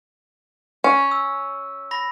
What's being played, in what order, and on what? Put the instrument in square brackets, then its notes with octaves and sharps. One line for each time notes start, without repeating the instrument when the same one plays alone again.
[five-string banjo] C#4
[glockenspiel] E6
B5 A#6